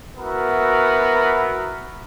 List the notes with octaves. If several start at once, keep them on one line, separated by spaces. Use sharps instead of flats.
B3 E4 F#4 A#4